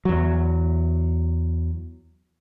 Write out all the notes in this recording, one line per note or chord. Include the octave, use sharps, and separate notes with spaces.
E2 F#3